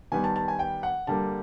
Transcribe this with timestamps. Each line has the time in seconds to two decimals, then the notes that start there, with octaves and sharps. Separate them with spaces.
0.12 D#3 G3 B3 G#5
0.24 A5
0.36 A5
0.48 G#5
0.59 G5
0.83 F#5
1.07 D3 G3 A#3 A5